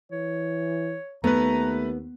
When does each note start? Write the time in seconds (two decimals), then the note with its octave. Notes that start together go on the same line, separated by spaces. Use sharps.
0.12 E3 C#5
1.24 D#2 A3 B3 B4 A#5